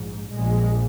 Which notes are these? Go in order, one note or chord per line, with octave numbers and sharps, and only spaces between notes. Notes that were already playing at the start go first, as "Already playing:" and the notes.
Already playing: A#1 G#2
A#1 A#2 G#3